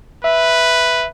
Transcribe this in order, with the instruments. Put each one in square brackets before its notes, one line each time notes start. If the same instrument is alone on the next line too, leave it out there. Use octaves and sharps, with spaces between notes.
[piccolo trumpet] B4 [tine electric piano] E5